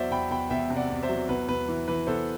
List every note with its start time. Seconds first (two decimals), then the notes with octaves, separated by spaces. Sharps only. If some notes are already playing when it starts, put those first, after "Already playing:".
Already playing: E2 F#3 C5 D5 E5 F#5
0.11 E2 G5 B5
0.31 E2 G5 B5
0.50 E2 E5 G5
0.70 C3
0.76 D5 F#5
0.90 E2
1.03 C5 E5
1.09 F#3
1.29 E2 B4
1.48 E2 B4
1.69 E3
1.88 E3 B4
2.07 E2 A4 C5